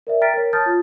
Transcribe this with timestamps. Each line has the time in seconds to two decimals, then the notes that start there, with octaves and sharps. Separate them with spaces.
0.07 A#4 D5 E5
0.21 G5 A#5 F6 A6 B6 D7
0.34 A#4 C#5
0.53 A5 D#6 F6 G6 A6
0.66 F4